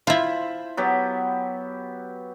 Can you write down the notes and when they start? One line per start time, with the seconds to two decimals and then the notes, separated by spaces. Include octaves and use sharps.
0.07 E4 F4 C5 A5 B5
0.77 F#3 B3 G4